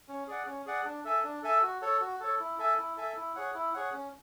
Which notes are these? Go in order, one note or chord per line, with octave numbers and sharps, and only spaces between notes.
C#4
G#4 D5 F#5
C#4
G#4 D5 F#5
D4
A4 E5 G#5
D4
A4 E5 G#5
F#4
A4 C#5
F#4
A4 C#5
E4
A4 E5 G#5
E4
A4 E5 G#5
E4
G#4 C#5 F#5
E4
G#4 C#5 F#5
C#4